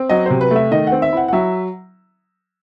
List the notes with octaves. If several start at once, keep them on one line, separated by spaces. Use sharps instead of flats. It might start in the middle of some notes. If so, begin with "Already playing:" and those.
Already playing: C4
F#3 D#5
C3 C5
B4
A3 E5
D#3 D#5
F#5
C4
E5
E4 F#5
F#5
F#3 E5